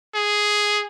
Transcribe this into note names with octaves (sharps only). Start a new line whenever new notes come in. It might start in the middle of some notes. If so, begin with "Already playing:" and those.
G#4